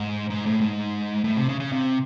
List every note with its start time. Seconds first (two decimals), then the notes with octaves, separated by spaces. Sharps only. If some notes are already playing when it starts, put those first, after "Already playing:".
Already playing: G#2
0.30 G#2
0.46 A2
0.61 G#2
1.24 A2
1.37 C3
1.49 C#3
1.60 C#3
1.72 C3